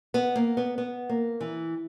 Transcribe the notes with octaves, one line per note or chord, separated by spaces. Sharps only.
B3
A#3
B3
B3
A#3
E3